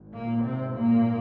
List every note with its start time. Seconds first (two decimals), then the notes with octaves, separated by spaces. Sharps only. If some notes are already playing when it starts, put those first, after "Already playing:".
Already playing: G#1
0.13 A#2 A#3
0.44 C3 C4
0.73 A#2 A#3